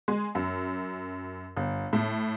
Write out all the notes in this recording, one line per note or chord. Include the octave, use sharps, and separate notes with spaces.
G#3
F#2
G1
A2